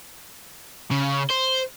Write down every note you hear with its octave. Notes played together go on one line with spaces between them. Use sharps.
C#3
C5